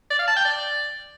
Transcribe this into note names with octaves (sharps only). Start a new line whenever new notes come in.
D5
F5
A5
G5
D5